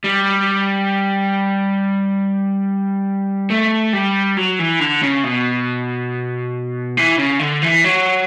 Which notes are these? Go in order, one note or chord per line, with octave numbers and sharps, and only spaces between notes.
G3
A3
G3
F#3
E3
D3
C#3
B2
E3
C#3
D3
E3
F#3